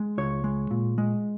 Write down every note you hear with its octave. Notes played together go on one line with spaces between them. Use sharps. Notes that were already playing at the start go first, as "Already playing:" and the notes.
Already playing: G#3
C#2 C#5
G#3
A#2
G#3